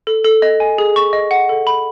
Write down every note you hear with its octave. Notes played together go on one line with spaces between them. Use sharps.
A4
A4
D#5
G#5
G#4
C#6
D#5
F#5
A4
B5